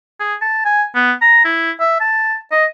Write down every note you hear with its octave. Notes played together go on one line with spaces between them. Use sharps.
G#4
A5
G#5
B3
A#5
E4
E5
A5
D#5